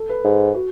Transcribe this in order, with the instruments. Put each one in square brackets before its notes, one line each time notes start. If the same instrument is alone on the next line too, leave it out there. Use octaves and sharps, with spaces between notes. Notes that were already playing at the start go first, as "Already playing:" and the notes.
Already playing: [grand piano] A4
B4
[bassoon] G#2
[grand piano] F#4